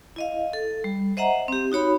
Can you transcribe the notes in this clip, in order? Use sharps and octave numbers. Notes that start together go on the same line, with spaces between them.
E4 D#5 F5
A4
G3
C5 D#5 E5 F#5 A#5
C4 G4
D#4 F#4 C#5 B5